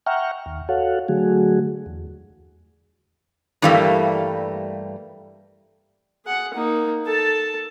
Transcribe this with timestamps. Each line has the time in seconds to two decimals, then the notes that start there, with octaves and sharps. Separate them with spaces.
0.06 E5 F#5 G5 A#5 C#6 F6
0.46 D#2
0.69 F#4 A4 C#5 F5 F#5
1.08 D3 F#3 A3 F#4 G#4
1.86 E2
3.62 G2 E3 G3 A3 A#3
6.25 G#4 F#5
6.54 A#3 D#4
7.06 A4 A5